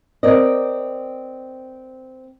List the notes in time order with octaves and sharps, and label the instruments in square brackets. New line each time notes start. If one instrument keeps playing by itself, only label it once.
[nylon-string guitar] C4 A#4 D5 D#5